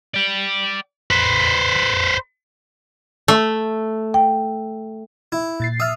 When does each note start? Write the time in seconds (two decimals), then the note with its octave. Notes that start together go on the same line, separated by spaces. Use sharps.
0.14 D5 G5
1.11 B4 C5
3.28 A3
4.14 G5
5.32 E4
5.60 A#2 A6 C7
5.80 E5 D#6 F6